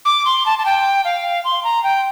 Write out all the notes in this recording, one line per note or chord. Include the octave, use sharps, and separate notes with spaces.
D6
C6
A5
A5
G5
F5
C6
A#5
G5